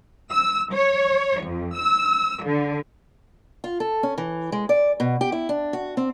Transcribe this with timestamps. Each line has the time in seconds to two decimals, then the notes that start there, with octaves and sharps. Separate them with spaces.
0.32 E6
0.74 C#5
1.42 F2
1.78 E6
2.45 D3
3.64 F4
3.80 A4
4.03 C#4
4.18 E3
4.52 G#3
4.69 D5
5.00 B2
5.21 G4
5.32 E4
5.49 D4
5.73 F#4
5.97 C4